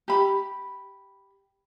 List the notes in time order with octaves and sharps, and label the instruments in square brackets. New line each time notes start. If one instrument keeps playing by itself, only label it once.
[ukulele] G4 B5